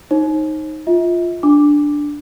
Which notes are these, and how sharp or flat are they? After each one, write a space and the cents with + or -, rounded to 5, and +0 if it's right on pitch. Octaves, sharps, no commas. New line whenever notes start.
D#4 +0 C5 +45
F4 +0 E5 -40
D4 +0 D6 +0